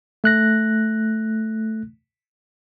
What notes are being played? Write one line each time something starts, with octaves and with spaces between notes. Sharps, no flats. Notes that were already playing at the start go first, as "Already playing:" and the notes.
A3 F#6 A#6